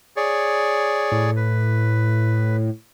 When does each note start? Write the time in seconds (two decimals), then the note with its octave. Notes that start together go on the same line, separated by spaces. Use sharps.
0.16 G#4 C#5 D5
1.12 A2
1.36 B4